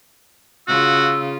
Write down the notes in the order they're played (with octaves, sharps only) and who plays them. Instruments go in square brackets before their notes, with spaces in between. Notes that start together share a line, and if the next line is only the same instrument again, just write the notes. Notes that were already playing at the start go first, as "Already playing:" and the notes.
[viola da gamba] C#3 F4 [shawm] F#4 [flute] E6